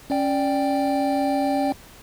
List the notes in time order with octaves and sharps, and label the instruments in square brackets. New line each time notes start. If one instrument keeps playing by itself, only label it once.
[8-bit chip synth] C#4 D5 G5